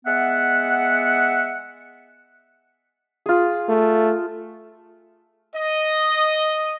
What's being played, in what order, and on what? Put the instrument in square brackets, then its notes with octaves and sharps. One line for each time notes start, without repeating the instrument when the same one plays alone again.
[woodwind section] G#3 B3 E5 F#5
[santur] F4 G#4
[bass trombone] A3
[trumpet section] D#5